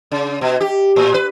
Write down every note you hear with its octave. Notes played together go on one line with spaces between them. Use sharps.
C#3
B2
G4
A2
B4